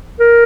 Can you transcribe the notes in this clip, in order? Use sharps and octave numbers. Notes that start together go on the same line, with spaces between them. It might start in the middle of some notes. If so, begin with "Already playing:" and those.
A#4